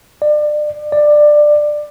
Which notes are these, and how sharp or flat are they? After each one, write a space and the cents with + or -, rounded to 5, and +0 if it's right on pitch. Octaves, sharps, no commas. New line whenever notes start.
D5 +30
D5 +15